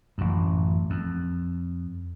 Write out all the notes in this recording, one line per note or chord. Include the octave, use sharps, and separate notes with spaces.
A1 F#2
F2